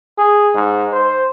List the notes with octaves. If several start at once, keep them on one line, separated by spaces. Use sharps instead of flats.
G#4
G#2
C5